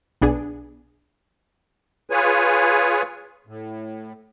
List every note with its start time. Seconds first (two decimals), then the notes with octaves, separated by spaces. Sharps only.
0.21 B1 B3 D4 G#4
2.10 F4 G#4 B4 C#5 G#5
3.47 A2